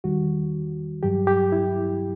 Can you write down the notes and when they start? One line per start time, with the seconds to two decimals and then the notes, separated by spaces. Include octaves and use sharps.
0.04 E2 D#3 G3 F#4
1.03 G2 F#3 G4
1.27 G4
1.52 E4